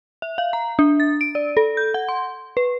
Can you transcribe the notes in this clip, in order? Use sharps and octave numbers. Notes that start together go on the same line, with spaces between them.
E5
F5
A#5
D4
A6
D7
D5
A4
G6
F#5
C6
B4